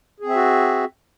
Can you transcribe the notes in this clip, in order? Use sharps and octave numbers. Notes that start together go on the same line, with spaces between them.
C4 F#4 G#4 E5